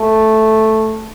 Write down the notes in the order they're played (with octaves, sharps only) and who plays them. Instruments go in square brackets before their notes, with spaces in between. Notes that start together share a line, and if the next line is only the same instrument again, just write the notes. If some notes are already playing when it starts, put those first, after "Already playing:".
Already playing: [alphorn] A3